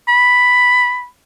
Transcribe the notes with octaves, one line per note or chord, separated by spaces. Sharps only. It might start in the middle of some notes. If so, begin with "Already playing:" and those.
B5